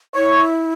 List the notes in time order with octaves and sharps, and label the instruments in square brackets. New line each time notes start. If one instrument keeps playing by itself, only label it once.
[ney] E4 [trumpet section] C#5